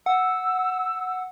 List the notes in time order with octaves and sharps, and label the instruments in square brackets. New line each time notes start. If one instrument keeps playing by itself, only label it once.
[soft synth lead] F#5 [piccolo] E6